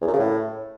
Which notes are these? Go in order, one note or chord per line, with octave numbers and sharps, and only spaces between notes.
E2
F#2
C#3
A2